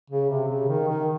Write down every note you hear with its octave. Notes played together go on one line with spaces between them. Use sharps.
C#3
C3
C#3
D#3
D#3